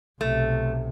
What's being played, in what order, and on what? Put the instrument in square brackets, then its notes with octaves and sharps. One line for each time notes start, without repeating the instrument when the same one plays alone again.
[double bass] B1 C3 [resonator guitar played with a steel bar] A3